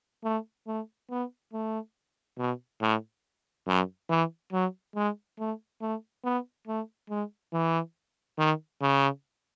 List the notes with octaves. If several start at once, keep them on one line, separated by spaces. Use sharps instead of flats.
A3
A3
B3
A3
B2
A2
F#2
E3
F#3
G#3
A3
A3
B3
A3
G#3
E3
D#3
C#3